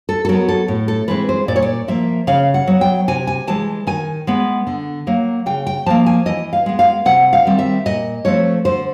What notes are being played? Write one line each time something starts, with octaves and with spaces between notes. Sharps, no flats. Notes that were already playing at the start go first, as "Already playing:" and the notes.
A4
A4
F#3 B3 A#4
A4
A2
A4
E3 G#3 C4 B4
C5
A#2 D5
C#5
D5
F3 A#3 E5
C#3 F5
F#5
F#3 B3
G5
C3 G#5
G#5
E3 G#3 A5
D#3 G#5
G#3 B3
D3
F#3 A#3
C#3 G5
G5
F3 A#3 A5
G#5
E3 D#5
F5
G#3 B3
F5
C3 F#5
F5
D#3 G3 C4
E5
A#2 D#5
F3 A3 C4 C#5
D3 C5